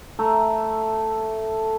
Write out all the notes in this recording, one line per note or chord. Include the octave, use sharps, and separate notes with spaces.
A3 E5 A#5